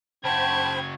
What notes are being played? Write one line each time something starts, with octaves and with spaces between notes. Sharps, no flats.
C#3 F#4 C5 G5 A5 B5 G#6